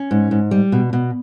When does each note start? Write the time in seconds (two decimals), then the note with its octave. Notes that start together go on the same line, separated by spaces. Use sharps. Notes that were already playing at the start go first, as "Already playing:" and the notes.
Already playing: C#4
0.11 G#2
0.31 G#2
0.51 G3
0.72 B2
0.93 B2